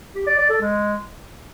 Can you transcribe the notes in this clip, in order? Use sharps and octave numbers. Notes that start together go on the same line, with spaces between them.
G4
D5
D5
A4
G#3